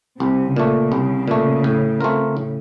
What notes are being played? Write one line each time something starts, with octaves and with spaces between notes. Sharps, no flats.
C2 C3
A#2 C#3 A3
C2
A#2 A3
A2
A3 C4 F4 A#4
A2